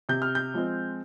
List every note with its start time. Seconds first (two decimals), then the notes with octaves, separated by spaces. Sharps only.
0.09 C3 G6
0.22 F6
0.35 G6
0.54 F3 G#3 C4